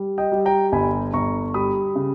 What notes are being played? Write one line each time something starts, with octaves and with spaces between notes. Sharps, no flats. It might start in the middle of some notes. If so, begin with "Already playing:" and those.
Already playing: G3
D#5 G5
G3
G5 A#5
G1 G#5 B5
G1 A#5 C#6
G3 B5 D#6
C#3